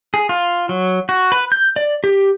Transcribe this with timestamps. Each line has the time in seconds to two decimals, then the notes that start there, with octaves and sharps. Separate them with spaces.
0.14 G#4
0.29 F4
0.69 F#3
1.09 F#4
1.32 B4
1.52 G6
1.76 D5
2.04 G4